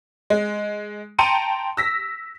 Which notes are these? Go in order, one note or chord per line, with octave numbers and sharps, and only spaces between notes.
G#3
G5 A5 A#5 C6 C#7 D#7
E6 A#6 B6